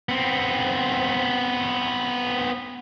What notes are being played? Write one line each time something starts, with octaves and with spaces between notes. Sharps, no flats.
B3 C4